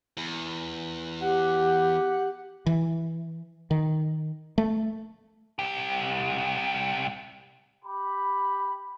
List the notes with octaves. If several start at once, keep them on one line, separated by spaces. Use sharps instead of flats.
E2
G4 F#5
E3
D#3
A3
C2 G4
G4 B5